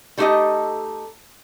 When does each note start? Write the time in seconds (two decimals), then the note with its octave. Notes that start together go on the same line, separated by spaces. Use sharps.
0.18 G3 A3 D#4 G4 A4 D#5